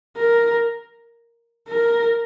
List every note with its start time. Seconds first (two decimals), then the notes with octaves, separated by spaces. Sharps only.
0.17 A#4
1.68 A#4